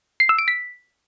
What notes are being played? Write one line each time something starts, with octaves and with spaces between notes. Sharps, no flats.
C7
E6
D7
B6